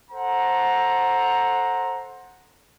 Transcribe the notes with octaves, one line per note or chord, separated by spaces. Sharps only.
A4 C5 F#5 A#5